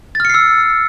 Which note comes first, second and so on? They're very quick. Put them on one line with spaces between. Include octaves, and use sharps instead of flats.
A6 F6 C#7 C7 E6